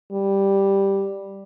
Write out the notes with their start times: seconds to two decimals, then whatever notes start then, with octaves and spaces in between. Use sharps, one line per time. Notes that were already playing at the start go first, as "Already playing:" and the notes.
0.12 G3